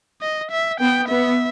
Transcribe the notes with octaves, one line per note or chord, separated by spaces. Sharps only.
D#5
E5
B3 G5
B3 E5